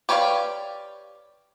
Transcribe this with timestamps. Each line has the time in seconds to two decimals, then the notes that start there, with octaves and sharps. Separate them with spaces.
0.09 G4 B4 C#5 D5 F5